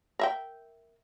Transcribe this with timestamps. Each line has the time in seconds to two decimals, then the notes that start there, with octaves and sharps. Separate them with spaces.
0.19 A#4 E5 G5